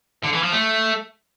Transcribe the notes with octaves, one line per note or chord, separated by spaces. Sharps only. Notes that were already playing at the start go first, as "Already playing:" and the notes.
D3
E3
F3
A3